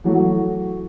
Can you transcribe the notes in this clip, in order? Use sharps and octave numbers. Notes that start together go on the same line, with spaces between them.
E3 F#3 A3 F#4